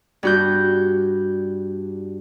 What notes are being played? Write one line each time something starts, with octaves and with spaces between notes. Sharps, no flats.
G2 F#4 G6